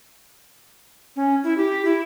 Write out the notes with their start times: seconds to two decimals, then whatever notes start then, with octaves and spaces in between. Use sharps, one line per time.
1.16 C#4
1.44 E4
1.57 G4
1.85 E4